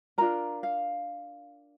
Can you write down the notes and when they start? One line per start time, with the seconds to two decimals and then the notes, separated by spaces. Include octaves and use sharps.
0.18 D4 F4 A#4 A#5
0.63 F5